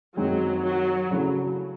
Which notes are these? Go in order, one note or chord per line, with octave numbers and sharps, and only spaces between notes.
F#2 D#3 F#3 G#3 C4
F#3
C#3 F#3 A3 C#4 E4